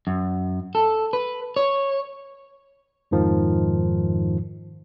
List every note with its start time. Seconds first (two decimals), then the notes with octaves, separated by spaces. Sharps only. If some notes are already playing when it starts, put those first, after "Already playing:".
0.07 F#2
0.75 A4
1.13 B4
1.56 C#5
3.11 F2 G#2 D#3 F3